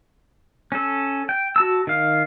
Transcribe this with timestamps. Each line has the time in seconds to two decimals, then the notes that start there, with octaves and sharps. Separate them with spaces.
0.72 C#4 A4
1.29 G5
1.56 F#4 A5 E6
1.87 D#3 F5